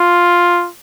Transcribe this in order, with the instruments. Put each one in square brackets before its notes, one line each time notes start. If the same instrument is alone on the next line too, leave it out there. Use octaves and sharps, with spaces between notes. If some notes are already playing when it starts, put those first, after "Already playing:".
Already playing: [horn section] F4